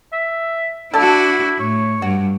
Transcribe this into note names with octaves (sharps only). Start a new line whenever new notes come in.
E5
D4 E4 F#4 A4 D5
A2 C#5
G2 F#4